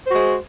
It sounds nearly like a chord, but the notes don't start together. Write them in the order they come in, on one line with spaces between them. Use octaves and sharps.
C5 F#4 G#3